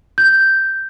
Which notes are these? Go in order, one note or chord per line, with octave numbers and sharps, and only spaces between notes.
G6